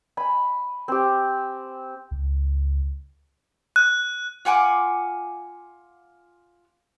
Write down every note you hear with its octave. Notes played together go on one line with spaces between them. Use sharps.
G#5 B5
C4 G4
C#2
F#6
F4 F#5 G#5 D6